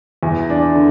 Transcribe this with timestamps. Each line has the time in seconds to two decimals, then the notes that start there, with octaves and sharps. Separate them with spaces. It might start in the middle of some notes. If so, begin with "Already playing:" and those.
0.23 E2
0.50 D4
0.75 D3